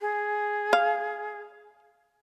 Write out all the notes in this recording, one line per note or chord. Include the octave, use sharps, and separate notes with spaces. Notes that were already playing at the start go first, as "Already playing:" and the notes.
G#4
F5